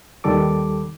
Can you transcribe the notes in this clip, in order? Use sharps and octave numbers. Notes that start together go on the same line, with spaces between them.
D#2 D#3 G3 A4 D6